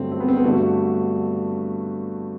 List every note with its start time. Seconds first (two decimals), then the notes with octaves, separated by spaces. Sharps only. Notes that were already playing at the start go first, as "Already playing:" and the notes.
Already playing: G2 D3 F#3 A3 C4
0.12 C4
0.20 B3
0.28 C4
0.37 B3
0.44 G2 D3 A3 F#4